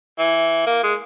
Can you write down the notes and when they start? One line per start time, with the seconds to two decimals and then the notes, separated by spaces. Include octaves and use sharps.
0.19 E3
0.67 A#3
0.83 G#3